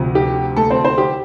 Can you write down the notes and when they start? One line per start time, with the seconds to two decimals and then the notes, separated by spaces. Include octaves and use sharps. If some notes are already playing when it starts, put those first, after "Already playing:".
Already playing: D2 C3 F3
0.15 G4
0.57 A3 A4
0.70 C4 C5
0.84 C4 C5
0.98 G4